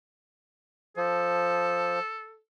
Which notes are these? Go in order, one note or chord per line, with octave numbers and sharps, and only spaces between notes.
F3 A4